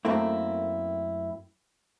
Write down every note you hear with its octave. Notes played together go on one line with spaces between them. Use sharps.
F#2 A3 A#3 C4 E4